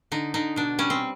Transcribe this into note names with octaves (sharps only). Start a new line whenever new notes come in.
D3 D#4
D3 D#4
B2 D4
G3 C#4
C4